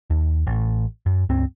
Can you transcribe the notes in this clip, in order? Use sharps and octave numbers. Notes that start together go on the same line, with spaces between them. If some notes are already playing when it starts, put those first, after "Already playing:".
D#2
A1
F#2
C#2 G2 C4